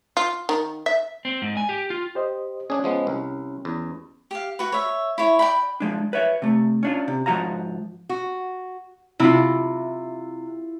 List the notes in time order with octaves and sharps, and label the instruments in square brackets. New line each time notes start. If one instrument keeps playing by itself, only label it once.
[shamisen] F4
D#3
E5
[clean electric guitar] C4
G#2
G#5
G4
F4
[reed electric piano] G4 C5 D#5
[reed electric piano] C#4 [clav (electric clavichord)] D4 G#4
[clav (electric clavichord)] F3 G#3 B3
C2
E2
[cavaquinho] G4 F5
F#4 B4
C#5 E5
E4 C#5
D5 G5 B5
[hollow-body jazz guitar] F3 G#3 D4
B4 C#5 E5
C3 A3
C#4 D4 F4
C3
G#2 F3 D#4 F#4 F5 A#5
[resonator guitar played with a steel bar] F#4
[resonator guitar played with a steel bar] C3 [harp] E4 F4